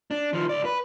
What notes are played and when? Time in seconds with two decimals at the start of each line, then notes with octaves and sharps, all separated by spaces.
0.11 D4
0.33 D#3 F3
0.49 C#2 D5
0.65 B4